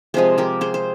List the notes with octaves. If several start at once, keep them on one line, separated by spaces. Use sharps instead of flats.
C3 F3 G#3 G#4 C5
G4 A#4
G#4 C5
C5